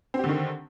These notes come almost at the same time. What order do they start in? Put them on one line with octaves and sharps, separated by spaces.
C4 G4 D3 D#3